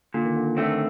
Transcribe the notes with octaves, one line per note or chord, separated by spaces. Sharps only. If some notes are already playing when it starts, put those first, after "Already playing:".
A#2 D3
D#3
D3
D#3
D3 A3 C4
D#3